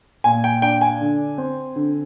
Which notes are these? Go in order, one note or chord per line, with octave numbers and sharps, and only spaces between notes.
A#2 G#5
G5
D4 G5
G#5
D3
C4
D3